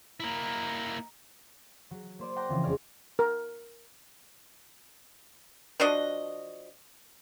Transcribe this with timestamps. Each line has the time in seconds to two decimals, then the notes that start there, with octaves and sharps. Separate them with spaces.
0.20 A#3 E4 D#5 A#5
1.91 F#3
2.19 A#3 C5 D5
2.36 F#5 G5 A#5 C6 D6 A#6
2.48 C#3 E3 F3 C4
2.64 E1 G#3 C#4 G#4 D5 F6
3.19 A#4
5.80 F3 D4 F#4 D#5